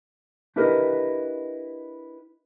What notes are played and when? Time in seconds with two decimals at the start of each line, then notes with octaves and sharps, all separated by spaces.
0.56 D4 E4 G4 A#4 B4 D#5